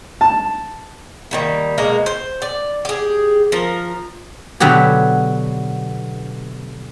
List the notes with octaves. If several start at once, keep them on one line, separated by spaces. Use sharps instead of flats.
A5
D#3 G3 A#3
B2 G#3 A#3 A#4
C5
D5
G4 G#4
F3 A#4
B2 D3 F#3 B3 G4